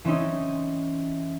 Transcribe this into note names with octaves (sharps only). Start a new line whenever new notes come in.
E3 C4 C#4 D#4